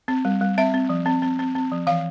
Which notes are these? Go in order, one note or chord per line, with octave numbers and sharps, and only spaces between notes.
C4
G3
G3
C4 E5
C4
F3
C4
C4
C4
C4
F3
E3 F5